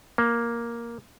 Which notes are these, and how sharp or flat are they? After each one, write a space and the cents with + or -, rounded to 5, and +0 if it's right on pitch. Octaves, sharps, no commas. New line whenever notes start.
A#3 +5